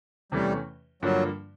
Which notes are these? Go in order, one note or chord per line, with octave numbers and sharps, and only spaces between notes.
E2 C3 E3 G3 A3 C#4
G2 D3 F3 F#3 A#3